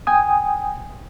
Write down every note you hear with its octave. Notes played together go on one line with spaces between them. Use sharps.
G5 G#5 D#6